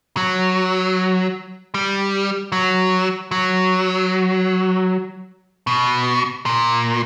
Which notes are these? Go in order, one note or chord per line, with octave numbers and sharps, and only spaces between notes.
F#3
G3
F#3
F#3
B2
A#2